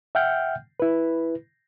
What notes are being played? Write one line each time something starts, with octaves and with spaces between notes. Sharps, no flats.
E5 F#5 G5 F6 G6
E4 B4